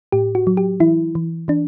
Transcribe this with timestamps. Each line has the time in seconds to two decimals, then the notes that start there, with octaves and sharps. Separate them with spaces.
0.12 A2 G4
0.35 F#4
0.47 F#3
0.57 G4
0.80 E3 E4
1.15 E3
1.48 E3 D4